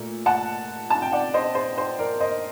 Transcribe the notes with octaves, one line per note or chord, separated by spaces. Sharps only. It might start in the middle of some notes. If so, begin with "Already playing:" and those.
Already playing: A#2 A3
F#5 A5
A5
G5
D5 F#5
C5 D#5
C5
C5
A#4 D5
C5 D#5